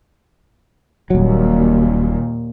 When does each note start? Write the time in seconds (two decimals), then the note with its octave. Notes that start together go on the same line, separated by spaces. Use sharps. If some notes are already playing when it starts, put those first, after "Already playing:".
1.10 D#1 D#2 A#2 F#3